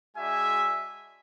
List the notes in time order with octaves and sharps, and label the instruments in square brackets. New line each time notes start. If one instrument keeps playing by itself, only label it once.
[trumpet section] G#3 D4 F#4 E5 G#5